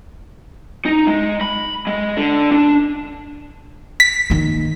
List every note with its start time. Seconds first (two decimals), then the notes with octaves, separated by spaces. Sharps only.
0.85 D#4
1.07 G#3
1.41 B5
1.87 G#3
2.17 D3
2.51 D4
4.00 B6
4.30 D#3 A#3